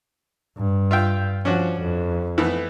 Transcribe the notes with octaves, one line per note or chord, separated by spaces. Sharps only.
G2
F4 E5 G5
F3 C#4 D4 F#4
F2
E3 A3 B3